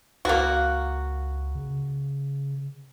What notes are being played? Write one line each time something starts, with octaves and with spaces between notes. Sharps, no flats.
C#2 A#3 F#4
C#3